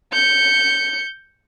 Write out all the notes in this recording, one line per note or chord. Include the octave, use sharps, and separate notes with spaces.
G6 C#7